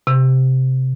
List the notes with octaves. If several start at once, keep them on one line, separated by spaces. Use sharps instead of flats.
C3